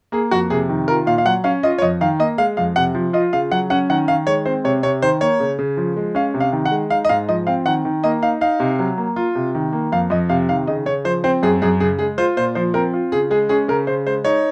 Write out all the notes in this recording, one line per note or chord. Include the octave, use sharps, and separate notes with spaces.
A#3 G#4
F2 F#4
C3 G#4
D#3
F4 A#4
A#2 F5
F5
F#3 F#5
C#4 F5
F4 D#5
C#5
F2 D#5
D#3 F5
A#3 D#5
G#3 F5
F2 F5
C3 F#5
F3
F4 D#5
C#3 F5
F#3 F#5
C#4 F#5
D#3 F#5
D#3 F5
G#3 C#5
C4 C5
C3 C#5
C3 C#5
D#3 C5
A#3 C#5
C#3
C#3
F3
G#3
C#4 F5
C3
F5
D#3
F#5
G#3
D#4 F5
D#5
G#2 F5
F3 D#5
C4 F5
D#3 F#5
D#3
A#3 D#5
D#4 F5
D#4 F5
C3
F#3
A#3
F4
C3
D#3
A#3
F2 F5
F2 D#5
C3 F5
D#3 F5
C#3 D#5
C#3 C#5
F3 C5
C4 C5
F#2 G#4
F#2 G#4
C#3 G#4
G#3 G#4
F4 C5
A#2 C5
F3 C5
C4 A#4
F4
C#3 G#4
G#3 G#4
C#4 G#4
C#3 A#4
C#3 C5
G#3 C5
D#4 C#5